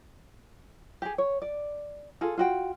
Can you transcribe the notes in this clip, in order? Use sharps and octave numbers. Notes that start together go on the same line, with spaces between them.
G4 G#4
C#5
D5
F4 G#4 A4
F4 F#4 G5